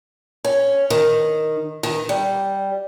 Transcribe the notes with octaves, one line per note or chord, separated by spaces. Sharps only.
C#4
D#3
D#3
G3